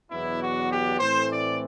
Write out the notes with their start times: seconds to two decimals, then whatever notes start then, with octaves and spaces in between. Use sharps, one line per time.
0.10 E2 B2 F#3 B3 D4 E4
0.41 F#4
0.70 G4
0.99 A2 E3 A3 C4 C5
1.30 D5